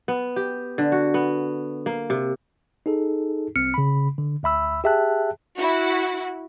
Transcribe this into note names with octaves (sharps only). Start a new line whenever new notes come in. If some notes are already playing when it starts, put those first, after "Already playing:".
B3
G4
D3
F#4
B3
A#3
C3
D#4 G#4 A4
C2 C4 F6 C#7
C#3 B5
D3
D2 E5 B5 E6
G4 G#4 E5 G5 A5 F#6
E4 F#4